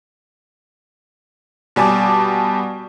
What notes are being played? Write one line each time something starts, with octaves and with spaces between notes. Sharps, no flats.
B2 G3 G#5 A5 D6